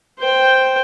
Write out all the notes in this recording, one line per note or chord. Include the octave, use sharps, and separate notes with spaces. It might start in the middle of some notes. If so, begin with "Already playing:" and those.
C5 G5